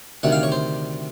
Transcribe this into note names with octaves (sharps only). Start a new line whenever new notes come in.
D2 C3 D#3 F#5
F5
C#5
C5